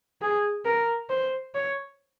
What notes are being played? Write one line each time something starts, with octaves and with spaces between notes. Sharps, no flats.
G#4
A#4
C5
C#5